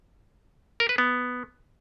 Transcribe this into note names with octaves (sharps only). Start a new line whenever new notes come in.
A#4
B4
B3